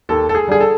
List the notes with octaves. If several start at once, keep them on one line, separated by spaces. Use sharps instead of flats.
D#2 A4
A4
G#4
D3 G3 G#4
A4